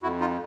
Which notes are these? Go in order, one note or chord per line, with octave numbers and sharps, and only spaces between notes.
F2 E4 F#4
D#4 F4